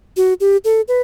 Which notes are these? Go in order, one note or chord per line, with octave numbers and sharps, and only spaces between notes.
F#4
G4
A4
B4